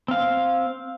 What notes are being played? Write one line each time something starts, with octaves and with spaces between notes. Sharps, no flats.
C4 F5